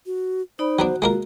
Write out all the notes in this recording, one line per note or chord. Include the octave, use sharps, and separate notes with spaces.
F#4
D#4 C5 D5 B5
F#3 B3 D4 F#4
G#3 A#3 F4 A#4